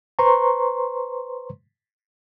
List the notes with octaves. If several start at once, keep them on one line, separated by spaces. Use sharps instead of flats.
B4 C5 A#5 C6 C#6